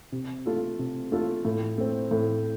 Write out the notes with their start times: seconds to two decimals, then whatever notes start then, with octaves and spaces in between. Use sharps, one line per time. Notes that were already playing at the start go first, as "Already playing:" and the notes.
0.12 C3
0.46 A3 F4 A4
0.79 C3
1.12 A3 F4 A4
1.45 A2
1.78 A3 C4
2.11 A2